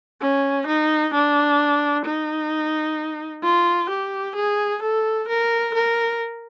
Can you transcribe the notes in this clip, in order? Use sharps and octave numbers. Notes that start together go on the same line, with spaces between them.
C#4
D#4
D4
D#4
F4
G4
G#4
A4
A#4
A#4